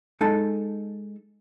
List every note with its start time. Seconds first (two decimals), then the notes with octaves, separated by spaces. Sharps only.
0.21 G#3 D#4 A4 A5